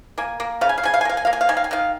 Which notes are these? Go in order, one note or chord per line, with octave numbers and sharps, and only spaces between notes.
A#3 G#5
A#3
C#3 F5
G#5
F5
C#3 G#5
F5
G#5
A#3 F5
G#5
A#3 F5
G#5
F5
D#3 G#5
F5
G#5
D#3 F5